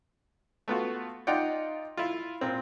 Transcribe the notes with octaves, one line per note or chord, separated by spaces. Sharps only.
A3 B3 F4 F#4
D#4 F4 D5 F#5 G5
E4 F4
A#2 C4